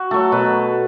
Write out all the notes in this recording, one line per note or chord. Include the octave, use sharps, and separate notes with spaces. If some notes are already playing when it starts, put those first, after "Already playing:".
Already playing: F#4
F#3 A3 A4
B2 B4